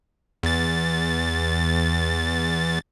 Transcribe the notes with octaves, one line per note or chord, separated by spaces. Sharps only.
E2 A6